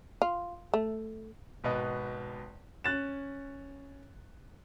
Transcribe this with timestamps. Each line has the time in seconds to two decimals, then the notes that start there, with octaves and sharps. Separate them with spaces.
0.22 F4
0.74 A3
1.64 G#1 B2 B4 D#5
2.84 C#4 F#6 A6 E7